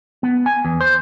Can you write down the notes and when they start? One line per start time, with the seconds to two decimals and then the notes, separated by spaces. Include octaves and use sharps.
0.23 B3
0.46 G#5
0.65 E2
0.81 C5